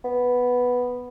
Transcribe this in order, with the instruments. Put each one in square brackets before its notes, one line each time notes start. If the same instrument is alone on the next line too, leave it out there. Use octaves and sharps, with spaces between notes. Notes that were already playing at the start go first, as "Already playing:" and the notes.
[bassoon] B3